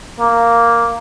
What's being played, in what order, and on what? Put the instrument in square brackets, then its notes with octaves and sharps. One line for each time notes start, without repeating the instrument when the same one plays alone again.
[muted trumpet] A#3